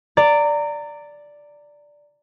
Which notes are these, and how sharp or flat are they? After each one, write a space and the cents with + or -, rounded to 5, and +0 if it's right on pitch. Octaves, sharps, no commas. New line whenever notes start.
D5 +0 A#5 -25